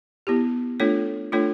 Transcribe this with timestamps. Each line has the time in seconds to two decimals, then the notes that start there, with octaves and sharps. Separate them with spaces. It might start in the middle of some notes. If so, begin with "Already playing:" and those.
0.27 B3 E4 G4
0.80 A3 D4 F4 A4 C#5
1.32 A3 D4 F4 A4 C#5